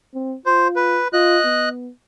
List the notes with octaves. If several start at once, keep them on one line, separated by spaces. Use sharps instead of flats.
C4
F4 C5
B4
F4 D#5 F#6
B3